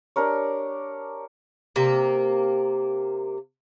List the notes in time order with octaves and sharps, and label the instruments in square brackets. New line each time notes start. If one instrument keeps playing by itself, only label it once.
[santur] D4 G4 A#4 C#5
[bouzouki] C3 A#3